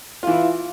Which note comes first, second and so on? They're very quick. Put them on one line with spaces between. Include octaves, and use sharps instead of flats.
F4 E3 E4